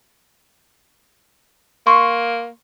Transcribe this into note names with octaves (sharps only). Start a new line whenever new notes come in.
A#3 C6 C#6